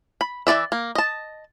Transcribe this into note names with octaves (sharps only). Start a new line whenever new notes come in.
B5
E3 E4 D5 E5
A#3
D#5 A5